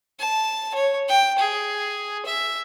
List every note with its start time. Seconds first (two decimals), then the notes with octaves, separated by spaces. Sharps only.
0.19 A5
0.74 C#5
1.08 G5
1.39 G#4
2.26 E5